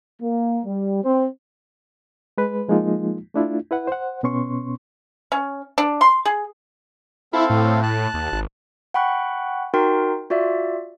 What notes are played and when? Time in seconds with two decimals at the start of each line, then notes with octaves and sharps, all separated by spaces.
0.22 A#3
0.66 G3
1.04 C4
2.38 G#3 B4
2.68 F3 G#3 A#3 D#4 F4
3.34 A3 D4 E4 F4
3.71 E4 B4 F#5
3.87 C5 F#5
4.23 B2 B3 C#4 C6 C#6
5.32 C#4
5.78 D4
6.01 C6
6.25 G#4
7.33 C4 E4 A4 F5
7.50 A2
7.83 A5 F#6
8.14 D#2
8.33 G#1
8.94 F#5 G5 B5 C#6 F#6
9.74 D#4 F#4 A#4 G5 C6
10.30 F4 F#4 D5 E5